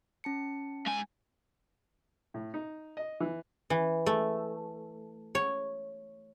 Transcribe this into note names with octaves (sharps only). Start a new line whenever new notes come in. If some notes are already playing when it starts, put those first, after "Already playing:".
C#4 A5 C#7
G#2 G#5
A2
D#4
D#5
E3
E3
A3
C#5